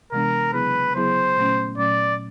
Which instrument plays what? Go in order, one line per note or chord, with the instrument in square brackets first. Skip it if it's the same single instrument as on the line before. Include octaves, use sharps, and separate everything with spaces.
[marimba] C3 E3 G#3 B3 D4 [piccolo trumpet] A#4
[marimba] C#3 F#3 B3 E4 G#4 [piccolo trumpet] B4
[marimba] C#3 F#3 B3 E4 G#4 [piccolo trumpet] C5
[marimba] A#2 F#3 A3 C#4
[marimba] A#2 F#3 A3 C#4 [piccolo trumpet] D5